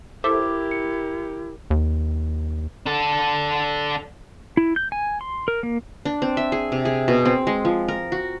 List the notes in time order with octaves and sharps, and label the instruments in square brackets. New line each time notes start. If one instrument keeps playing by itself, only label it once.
[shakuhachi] E4 [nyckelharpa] G4 A#4 [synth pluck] A4 C5 E5 [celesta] D6
[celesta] C#7
[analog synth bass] D#2
[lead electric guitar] D4 A4
[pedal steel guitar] E4
G6
G#5
C6
A#4
A#3
[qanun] D4
C4
E5
G#4
C3
G#4
B2
C4
G#3
F3
A#4
F#4